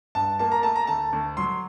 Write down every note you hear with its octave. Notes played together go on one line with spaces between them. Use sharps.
G2 A5
A#3 A5
A#5
A3 A5
A#5
D2 A5
D2
F#3 C6